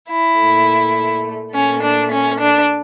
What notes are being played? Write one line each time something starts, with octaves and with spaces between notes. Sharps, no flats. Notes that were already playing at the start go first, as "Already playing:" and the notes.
E4
A#2 A3
A#2 A3 C#4
D4
C#4
D4